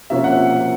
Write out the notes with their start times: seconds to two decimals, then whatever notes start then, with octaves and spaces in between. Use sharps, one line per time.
0.10 C3 F3 A#3 C#4 E5
0.24 F#5